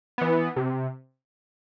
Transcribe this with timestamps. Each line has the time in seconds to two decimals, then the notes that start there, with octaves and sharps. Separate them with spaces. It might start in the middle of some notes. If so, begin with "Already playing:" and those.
0.18 E3 B3
0.56 C3